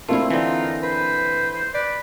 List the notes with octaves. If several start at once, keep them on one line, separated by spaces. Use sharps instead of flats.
A3 A#3 C4 D4 E4 F4
D3 E3 D#4
B4 C5
B4 D5